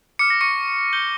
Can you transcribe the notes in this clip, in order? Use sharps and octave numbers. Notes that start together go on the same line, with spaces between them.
D6 F6 C#7
A#6
C#6 C#7
G6 G7